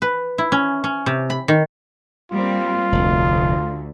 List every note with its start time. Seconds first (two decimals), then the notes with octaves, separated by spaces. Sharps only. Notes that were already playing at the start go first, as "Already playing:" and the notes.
0.02 B4
0.38 E4
0.52 C#4
0.84 C#4
1.06 C3
1.30 B5
1.48 D#3
2.32 G3 A#3 C4 F4
2.92 F1 D2